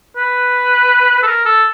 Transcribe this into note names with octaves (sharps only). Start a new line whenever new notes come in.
B4
A4
A#4
A4